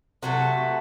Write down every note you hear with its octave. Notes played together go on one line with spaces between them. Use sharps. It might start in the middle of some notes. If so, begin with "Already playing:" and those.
C3 F#3 A3 F#4